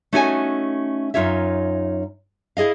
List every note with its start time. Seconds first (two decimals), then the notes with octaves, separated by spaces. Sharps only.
0.13 A3 C#4 D#4 F#4 C#5 G#5
1.14 F#2 D#4 F4 C#5 E5
2.57 E4 G#4 D#5 F5